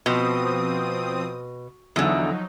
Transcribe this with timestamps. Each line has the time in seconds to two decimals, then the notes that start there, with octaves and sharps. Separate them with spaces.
0.06 B2 F3 C4 D#6
1.96 E2 D3 F3 F#3 D#4